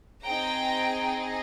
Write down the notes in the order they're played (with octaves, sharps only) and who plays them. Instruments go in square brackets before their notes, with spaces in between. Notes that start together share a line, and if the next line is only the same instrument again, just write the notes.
[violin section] C4 D#4 G#4 G5 A#5